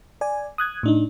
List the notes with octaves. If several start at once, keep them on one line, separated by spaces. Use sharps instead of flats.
D5 G#5
D#6 F#6 G#6
A2 D4 D#4